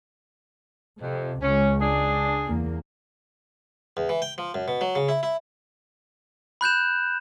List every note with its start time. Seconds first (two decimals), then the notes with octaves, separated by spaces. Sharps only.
1.01 F2 C3
1.42 C#2 C#4
1.81 D4 G#4
2.47 E2 A#3
3.97 E2
4.09 E3
4.22 G5
4.38 F3
4.54 F#2
4.68 B2
4.81 F#3
4.95 C#3
5.09 E4
5.23 E4
6.61 B5 F#6 G6 E7